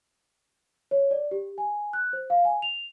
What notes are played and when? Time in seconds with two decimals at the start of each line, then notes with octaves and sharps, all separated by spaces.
0.91 C#5
1.11 D5
1.31 G4
1.58 G#5
1.93 F#6
2.13 C5
2.30 F5
2.45 G#5
2.62 F7